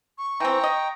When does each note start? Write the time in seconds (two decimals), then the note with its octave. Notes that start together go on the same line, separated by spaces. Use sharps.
0.18 C#6
0.40 E3 C4 G5 A#5
0.63 D#5